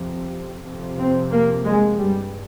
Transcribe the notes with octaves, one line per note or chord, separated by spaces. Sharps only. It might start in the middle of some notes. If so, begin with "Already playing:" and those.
Already playing: F2 C3
F2 C3
C4
A#3
G#3
G2 G3